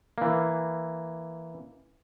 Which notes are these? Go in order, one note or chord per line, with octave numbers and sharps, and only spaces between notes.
E3 A#3